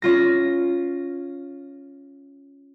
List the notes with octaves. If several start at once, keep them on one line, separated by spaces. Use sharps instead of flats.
C#4 F4 A#6